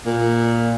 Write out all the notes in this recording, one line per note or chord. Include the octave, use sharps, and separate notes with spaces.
A#2